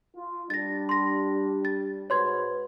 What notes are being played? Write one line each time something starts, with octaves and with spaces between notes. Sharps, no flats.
F4
G3 D4 A6 A#6
C6 A#6
A6
G#2 F#4 B4 C#5 C6 G#6